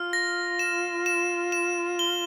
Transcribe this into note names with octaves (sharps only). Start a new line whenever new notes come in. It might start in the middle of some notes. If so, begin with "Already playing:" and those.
Already playing: F4 F6
A#6
E7
E7
E7
G7